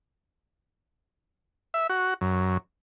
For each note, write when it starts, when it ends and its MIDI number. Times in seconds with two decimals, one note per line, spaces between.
1.74 1.87 76
1.90 2.14 66
2.21 2.58 42